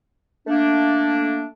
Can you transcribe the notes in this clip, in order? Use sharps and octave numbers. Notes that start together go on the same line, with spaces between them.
A3 A#3 D4